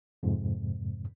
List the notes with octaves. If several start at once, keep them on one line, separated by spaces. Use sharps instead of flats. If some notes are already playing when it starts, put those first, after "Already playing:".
F2 G#2 C3